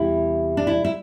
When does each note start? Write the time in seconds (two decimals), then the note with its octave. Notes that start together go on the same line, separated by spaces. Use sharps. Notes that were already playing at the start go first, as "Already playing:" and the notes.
Already playing: E2 C3 G3 E4
0.57 D4
0.67 E4
0.85 E4